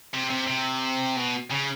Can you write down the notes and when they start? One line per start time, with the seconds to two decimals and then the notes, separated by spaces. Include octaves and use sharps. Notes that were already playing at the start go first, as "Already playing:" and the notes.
0.14 C3
0.30 C3
0.47 C3
1.17 B2
1.51 C#3